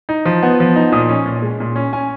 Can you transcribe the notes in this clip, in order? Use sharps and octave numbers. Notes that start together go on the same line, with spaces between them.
D#4
F3
B3
F3
D#4
A#2 D#6
C#4
A#2
G#3
A#2
C#4
C#4 G#5